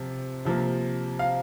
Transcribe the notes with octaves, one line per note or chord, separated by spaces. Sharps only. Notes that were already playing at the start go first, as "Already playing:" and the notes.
Already playing: C3 F3
C3 F3 A#3
F5